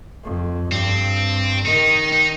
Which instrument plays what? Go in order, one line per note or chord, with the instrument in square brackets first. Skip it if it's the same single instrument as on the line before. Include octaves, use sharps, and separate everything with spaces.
[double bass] F2
[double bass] G2 [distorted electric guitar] C4
[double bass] D#3 [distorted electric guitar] D#4
[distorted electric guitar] D#4